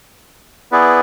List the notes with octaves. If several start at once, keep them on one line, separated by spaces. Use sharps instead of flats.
B3 E4 G#4 B4 D5